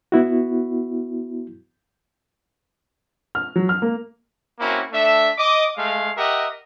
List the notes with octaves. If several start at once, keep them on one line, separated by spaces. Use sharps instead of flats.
B3 E4 F#4
F6
F#3
F6
A#3
A#3 C4 C#4 E4 F#4
A3 D4 E5
D#5 D6
G#3 A3 F5
G4 A#4 D#5 E5 F#5